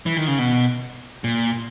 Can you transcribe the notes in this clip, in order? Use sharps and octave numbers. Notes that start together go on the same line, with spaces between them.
E3
D#3
C#3
B2
A#2